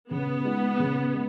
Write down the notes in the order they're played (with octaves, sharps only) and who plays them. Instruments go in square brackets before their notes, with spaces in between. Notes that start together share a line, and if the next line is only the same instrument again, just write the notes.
[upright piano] C#3 [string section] B3
[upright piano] G#3 D#4
C#3
G#3